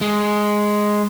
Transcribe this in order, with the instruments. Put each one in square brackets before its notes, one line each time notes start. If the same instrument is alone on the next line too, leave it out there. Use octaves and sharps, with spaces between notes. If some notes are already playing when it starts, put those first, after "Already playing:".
[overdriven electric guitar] G#3